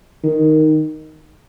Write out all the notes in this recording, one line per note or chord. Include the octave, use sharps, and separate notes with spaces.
D#3